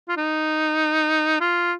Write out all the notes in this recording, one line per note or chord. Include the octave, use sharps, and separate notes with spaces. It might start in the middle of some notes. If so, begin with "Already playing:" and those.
F4
D#4
F4